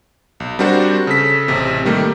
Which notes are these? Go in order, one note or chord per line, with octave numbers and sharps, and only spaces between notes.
B1
G3 C4 D4 F#4 A#4 C5
C#3 A4 B6
A1 C3
D#3 G3 A3 A#3